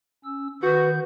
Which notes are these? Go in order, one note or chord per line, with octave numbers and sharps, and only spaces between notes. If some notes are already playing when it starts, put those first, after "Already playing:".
C#4 E6
D#3 F#4 B4 G6